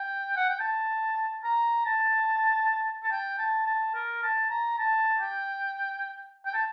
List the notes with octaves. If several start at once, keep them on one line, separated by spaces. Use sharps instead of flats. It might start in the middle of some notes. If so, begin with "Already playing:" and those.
Already playing: G5
F#5
G5
A5
A#5
A5
A5
G5
A5
A5
A#4
A5
A#5
A5
G5
G5
A5